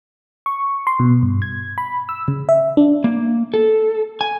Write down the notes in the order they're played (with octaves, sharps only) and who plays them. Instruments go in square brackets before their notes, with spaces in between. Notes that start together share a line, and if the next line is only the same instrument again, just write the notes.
[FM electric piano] C#6
C6
B2
G2
G#6
B5
E6
C#3
E5
D4
[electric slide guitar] A#3
A4
G#5